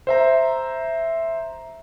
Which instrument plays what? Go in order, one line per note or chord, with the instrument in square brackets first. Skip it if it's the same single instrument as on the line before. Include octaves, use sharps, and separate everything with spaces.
[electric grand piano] C5 E5 A#5